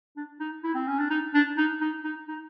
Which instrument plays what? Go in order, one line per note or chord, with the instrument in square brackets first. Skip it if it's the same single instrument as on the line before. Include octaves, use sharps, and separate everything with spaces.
[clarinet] D4
D#4
E4
C4
C#4
D4
D#4
D4
D#4
D#4
D#4
D#4